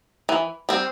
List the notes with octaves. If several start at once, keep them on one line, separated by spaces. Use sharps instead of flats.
E3
G3 C4